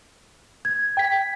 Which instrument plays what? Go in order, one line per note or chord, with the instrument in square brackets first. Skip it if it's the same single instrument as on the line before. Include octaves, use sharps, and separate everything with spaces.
[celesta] G#6
[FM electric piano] G5 B6